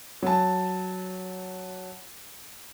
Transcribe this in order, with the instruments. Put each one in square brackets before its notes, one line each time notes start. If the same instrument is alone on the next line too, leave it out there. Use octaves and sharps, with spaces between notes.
[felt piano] F#3 A5